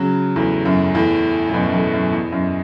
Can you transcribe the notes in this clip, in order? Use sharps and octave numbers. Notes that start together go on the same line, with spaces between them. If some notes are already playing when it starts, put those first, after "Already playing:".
Already playing: C#3 F#3
E2 A2
F#2
E2 A2
A2
F#2 B2
F#2
E2 A2
F#2
E2
F#2